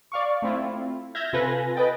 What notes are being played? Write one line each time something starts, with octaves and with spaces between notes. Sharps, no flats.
D5 F5 C#6
A3 C4 E4 F4
E5 F6 G6 G#6 A#6
C3 F4 A4 B4 G#5 A#6
B4 D#5 G5 A6